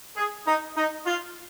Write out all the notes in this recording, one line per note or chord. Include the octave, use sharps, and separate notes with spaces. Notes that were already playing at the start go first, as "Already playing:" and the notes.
G#4
D#4
D#4
F4